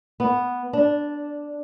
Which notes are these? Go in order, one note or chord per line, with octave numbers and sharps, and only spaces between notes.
B3
D4